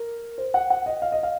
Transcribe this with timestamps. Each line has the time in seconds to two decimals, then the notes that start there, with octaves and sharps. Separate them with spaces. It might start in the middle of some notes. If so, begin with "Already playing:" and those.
Already playing: A#4
0.38 C5
0.54 F#5
0.70 F#5
0.86 D#5
1.02 F5
1.12 D#5
1.23 F5